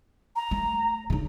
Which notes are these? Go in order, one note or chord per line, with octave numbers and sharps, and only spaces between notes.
A#5
A3
C#3 D#4